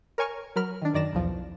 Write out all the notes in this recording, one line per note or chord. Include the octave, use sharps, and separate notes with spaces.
A#4 C#5 G#5 C#6 F6
F#3 A#4 B5 F6
D#3 D4
F#2 D#3 D5 A#6 E7
B1 E2 F3